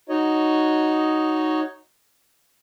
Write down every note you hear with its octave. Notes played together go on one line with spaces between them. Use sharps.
D#4 F#4 C#5 D#5